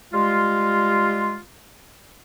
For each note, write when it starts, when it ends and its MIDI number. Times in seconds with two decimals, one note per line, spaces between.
0.13 1.39 55
0.13 1.39 56
0.13 1.39 65